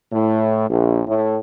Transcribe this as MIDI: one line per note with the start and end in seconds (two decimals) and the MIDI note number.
0.12 0.67 45
0.69 1.01 34
1.07 1.38 45